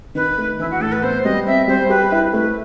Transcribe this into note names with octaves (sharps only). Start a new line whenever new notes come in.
D#3 B4
A3
E3 E4
F#4
A2 A4
B4
B3 C5
G3 D#5
C4 E5
G3 C5
G4 B4
E4
A3 B4